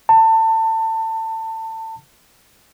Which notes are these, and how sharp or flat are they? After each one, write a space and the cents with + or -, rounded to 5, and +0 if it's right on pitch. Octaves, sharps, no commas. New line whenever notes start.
A5 +25